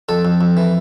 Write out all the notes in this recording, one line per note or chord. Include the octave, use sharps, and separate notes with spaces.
F2 A4
F2
F2
E3